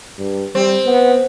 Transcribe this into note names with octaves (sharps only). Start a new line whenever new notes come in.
G2
G3 C4
B3